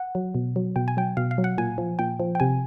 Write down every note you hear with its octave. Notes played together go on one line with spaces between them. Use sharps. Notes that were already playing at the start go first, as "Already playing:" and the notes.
Already playing: F#5
F#3
B2
F#3
B2 G5
G#5
F#3 G5
B2 F5
F5
F#3
F#5
A#2 G#5
F3
A#2 G5
F3
G5
C3 G#5